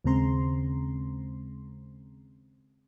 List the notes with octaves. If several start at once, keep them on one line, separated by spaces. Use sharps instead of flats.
D#2 C#3 G#3 C4 A#5 C6